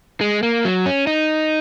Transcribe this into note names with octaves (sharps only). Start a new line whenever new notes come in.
G#3
A#3
F#3
C#4
D#4